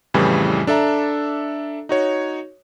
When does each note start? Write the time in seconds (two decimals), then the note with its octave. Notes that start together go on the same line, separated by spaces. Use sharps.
0.14 F2 A2 C#3 E3 G3
0.67 D4 A4 E5 A#5
1.89 D#4 F#4 C#5